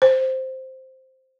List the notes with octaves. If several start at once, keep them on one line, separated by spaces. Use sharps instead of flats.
C5